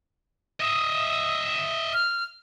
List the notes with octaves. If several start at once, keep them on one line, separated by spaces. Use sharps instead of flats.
D#5 E5 D#6
F6